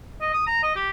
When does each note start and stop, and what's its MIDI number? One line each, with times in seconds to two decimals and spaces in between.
0.21 0.33 75
0.34 0.44 87
0.47 0.58 82
0.63 0.72 75
0.76 0.90 67